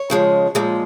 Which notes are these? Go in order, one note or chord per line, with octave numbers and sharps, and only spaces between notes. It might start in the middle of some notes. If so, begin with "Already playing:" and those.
Already playing: C#5
C#3 F3 G#3
A#2 F3 G#3